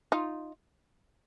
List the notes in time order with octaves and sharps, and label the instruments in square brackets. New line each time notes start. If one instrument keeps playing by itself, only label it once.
[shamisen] D#4 F4